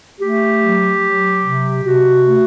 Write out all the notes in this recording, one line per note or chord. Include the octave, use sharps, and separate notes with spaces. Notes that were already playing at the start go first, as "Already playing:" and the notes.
A3 G4
F#3
F#3
C3
C3 F#4
A3